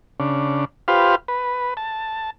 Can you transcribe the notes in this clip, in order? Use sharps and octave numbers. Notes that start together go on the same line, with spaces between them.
C#3 D4
F4 G4 B4 C5 F5
B4
A5